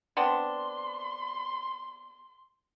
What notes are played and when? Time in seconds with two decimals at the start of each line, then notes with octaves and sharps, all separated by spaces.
0.17 B3 C4 D4 C6